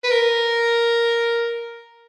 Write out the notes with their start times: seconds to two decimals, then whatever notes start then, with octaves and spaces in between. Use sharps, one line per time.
0.04 B4
0.11 A#4